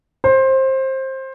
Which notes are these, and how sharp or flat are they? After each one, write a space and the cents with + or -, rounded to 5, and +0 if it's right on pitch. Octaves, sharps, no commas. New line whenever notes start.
C5 +20